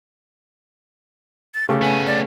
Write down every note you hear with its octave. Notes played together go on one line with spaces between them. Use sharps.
A6
C#3 A3 G4
B3 C#4 G#5
D5